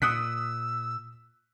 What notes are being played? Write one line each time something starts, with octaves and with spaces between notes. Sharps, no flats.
A#2 D#6 E6 F#6 B6